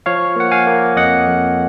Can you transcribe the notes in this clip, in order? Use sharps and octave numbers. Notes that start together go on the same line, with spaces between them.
F3 C#5 F5
A#3 F#5
F5 G#5
A#3
F2 D#5 F#5
F2